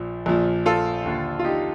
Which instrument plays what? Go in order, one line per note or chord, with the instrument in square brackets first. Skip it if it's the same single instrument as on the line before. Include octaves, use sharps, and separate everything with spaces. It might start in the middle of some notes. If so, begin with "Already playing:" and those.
Already playing: [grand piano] A#1 A#2 F3
A#1 A#2 F3
F4 A4
D#2 D3 F3
F4
D#4 G4